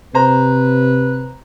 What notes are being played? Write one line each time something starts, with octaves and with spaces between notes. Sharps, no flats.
C3 B4 C5 A#5